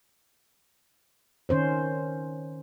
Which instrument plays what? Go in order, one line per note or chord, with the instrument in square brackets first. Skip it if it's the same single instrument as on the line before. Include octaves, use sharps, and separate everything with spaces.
[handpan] D#3 C#4 C5 C#5